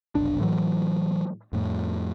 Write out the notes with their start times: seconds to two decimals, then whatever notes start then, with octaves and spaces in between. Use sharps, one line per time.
0.15 F1 B1 D4
0.39 A2 E3 F#3
1.53 F2 A2